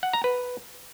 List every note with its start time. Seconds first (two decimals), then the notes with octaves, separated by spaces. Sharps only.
0.03 F#5
0.13 A#5
0.24 B4